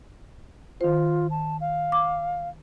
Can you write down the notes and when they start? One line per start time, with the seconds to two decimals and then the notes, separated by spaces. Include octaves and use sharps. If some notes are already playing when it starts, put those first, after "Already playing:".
0.81 D#3 F4 C5
1.30 A5
1.61 F5
1.92 D6